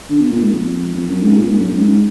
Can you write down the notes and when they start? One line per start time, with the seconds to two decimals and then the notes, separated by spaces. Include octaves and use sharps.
0.09 D3
0.20 B2
0.31 A#2
0.42 G#2
0.52 F2
0.94 F2
1.08 F#2
1.23 G#2
1.37 A#2
1.48 G#2
1.58 F#2
1.69 F#2
1.79 G#2